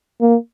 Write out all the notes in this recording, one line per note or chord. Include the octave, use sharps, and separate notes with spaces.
A#3